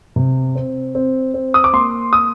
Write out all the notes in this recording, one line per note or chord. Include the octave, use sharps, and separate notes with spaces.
C3
C4
C4
C4
D#6
D6
A#3 C6
D#6